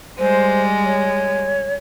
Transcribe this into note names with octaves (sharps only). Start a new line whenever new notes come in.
G3 G#3 C5
C#5